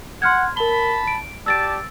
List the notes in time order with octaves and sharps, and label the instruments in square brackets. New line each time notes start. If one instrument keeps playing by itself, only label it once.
[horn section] F#5 [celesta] C6 F6 G#6
[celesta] A#4 G7 [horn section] A5 B5
[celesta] D7
[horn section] G4 D5 A5 [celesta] E6 A6 D7